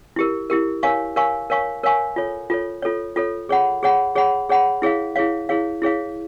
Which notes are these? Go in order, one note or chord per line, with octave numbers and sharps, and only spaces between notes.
E4 G4 A#4
E4 G4 A#4
A#4 C#5 F5 G#5 C#6
A#4 C#5 F5 G#5 C#6
A#4 C#5 F5 G#5 C#6
A#4 C#5 F5 G#5 C#6
F4 A4 C#5
F4 A4 C#5
F4 A4 C#5
F4 A4 C#5
G#4 C#5 F#5 B5
G#4 C#5 F#5 B5
G#4 C#5 F#5 B5
G#4 C#5 F#5 B5
E4 G#4 C#5 F5
E4 G#4 C#5 F5
E4 G#4 C#5 F5
E4 G#4 C#5 F5